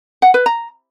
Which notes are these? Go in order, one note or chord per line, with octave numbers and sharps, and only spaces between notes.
F#5
B4
A#5